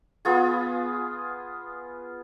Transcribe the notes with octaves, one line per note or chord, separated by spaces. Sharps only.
B3 F4 G#4